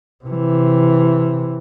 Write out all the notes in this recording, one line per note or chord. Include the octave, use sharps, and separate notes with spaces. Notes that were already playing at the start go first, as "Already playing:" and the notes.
C3 E3